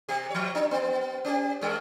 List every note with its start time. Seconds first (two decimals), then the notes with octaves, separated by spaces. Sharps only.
0.09 C3 G4
0.30 F3 C#5
0.55 D4
0.71 B3
1.25 C#4 G4
1.61 G2 G3